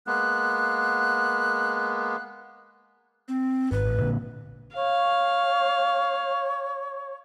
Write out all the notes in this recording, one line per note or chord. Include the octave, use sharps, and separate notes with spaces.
G#3 A#3 B3 F#6
C4
G#1 B4
A1
A#2 D3 A#3
C#5 F5